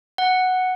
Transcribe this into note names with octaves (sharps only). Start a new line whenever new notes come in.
F#5